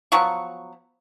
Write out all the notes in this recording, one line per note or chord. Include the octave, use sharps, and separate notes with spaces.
F3 F#3 B3 C#6